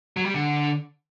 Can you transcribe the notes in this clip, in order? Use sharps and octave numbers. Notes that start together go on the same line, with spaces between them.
F#3
G3
D3